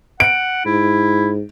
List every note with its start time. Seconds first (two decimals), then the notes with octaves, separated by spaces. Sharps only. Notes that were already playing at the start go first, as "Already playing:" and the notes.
0.20 F#5 D7
0.65 G#2 E4